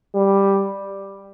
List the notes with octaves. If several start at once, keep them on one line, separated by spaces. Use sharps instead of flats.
G3